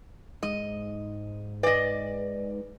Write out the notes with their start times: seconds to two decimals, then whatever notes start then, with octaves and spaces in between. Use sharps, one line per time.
0.43 G#2 D#5
1.63 B4 D5 D#5